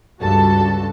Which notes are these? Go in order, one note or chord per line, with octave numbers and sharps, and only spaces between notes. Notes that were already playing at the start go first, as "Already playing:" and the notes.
C#2 G2 F#4 A4 A5